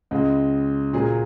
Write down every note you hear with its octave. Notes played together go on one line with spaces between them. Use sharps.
C#2 C#3 G#3
A#2 F#3 A#3 G#4